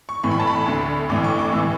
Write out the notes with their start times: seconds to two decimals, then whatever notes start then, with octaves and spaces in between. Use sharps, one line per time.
0.09 C#6
0.23 A1 A2 E3 C#6
0.31 B5
0.40 A5
0.47 B5
0.66 D2 D3
1.09 A1 A2 E3 D6
1.24 C#6
1.39 D6
1.53 A2 E3 E6